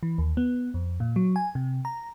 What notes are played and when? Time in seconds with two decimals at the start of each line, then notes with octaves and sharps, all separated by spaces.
0.03 E3
0.18 D#2
0.37 B3
0.74 F2
1.00 A#2
1.16 F#3
1.36 G#5
1.55 C3
1.85 A#5